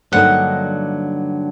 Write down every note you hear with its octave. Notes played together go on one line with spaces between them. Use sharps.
G2 D3 F#3 A#3 D#4 F#5